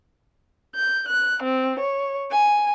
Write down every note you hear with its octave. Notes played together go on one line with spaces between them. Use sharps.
G6
F#6
C4
C#5
G#5